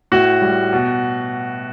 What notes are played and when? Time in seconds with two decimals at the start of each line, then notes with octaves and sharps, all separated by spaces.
0.12 A2 F#4
0.42 G3
0.73 B2